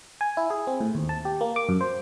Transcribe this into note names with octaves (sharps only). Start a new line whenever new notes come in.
G#5
E4
G#4
C4
A2
D#2
A5
G4
A#3
D6
F#2
C5